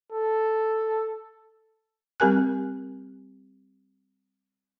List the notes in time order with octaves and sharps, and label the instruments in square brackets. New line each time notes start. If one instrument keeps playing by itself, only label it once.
[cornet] A4
[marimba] G3 C4 G4 A#4 G#5 F#6